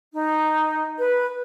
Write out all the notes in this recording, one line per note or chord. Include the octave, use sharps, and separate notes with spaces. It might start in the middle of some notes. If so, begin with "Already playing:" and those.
D#4
B4